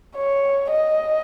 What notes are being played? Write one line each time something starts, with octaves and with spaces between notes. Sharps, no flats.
C#5
D#5